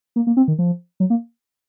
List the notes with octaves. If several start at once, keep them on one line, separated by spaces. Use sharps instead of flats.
A#3
A#3
C4
D#3
F3
F#3
A#3